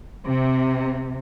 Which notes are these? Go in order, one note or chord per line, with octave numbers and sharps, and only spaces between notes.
C3